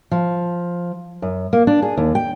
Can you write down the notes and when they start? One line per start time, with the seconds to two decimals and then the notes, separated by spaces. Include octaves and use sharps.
0.11 F3
1.22 F#2
1.53 A#3
1.67 D4
1.82 G#4
1.97 D#2
2.15 G5